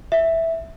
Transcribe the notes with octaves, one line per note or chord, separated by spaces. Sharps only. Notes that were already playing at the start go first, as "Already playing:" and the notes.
E5